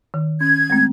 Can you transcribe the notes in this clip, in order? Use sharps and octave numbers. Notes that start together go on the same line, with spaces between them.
D#3
C#4 G#6
G#3 A3 C4